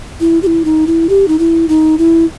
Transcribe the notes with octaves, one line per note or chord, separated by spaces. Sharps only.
E4
G4
E4
D#4
E4
G4
D#4
E4
D#4
E4